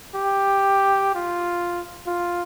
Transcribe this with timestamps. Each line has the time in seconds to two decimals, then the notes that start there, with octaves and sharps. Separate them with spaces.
0.15 G4
1.15 F4
2.07 F4